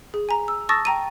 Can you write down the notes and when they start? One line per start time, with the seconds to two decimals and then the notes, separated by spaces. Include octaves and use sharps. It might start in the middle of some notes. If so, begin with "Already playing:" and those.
0.14 G#4
0.29 G#5 A#5
0.48 E6
0.69 A5 C#6 D#6 E6 A6 A#6
0.85 G5 A#5 D#7